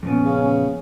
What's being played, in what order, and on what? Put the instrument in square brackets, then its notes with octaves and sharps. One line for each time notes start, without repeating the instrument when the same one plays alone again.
[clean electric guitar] F2 A#2 B3 [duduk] C#4
[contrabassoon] C#3